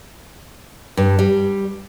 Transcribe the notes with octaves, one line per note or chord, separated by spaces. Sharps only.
G2
G3